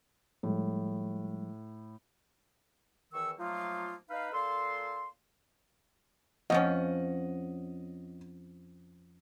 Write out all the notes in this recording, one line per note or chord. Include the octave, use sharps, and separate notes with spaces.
A2 F3 G3 G#3
E2 D#3 E3 C#6 E6
F3 F#3 A3 A#3 D#4 F4
D#4 B4 F5
A#2 A4 F5 C6
F2 F3 C#4 D#5 F#5